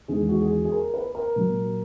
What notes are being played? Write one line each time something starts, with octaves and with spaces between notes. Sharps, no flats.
E2 D#3 G#3 G#4
F#4
G#4
G#4
A#4
B4
A#4
A#2 F#3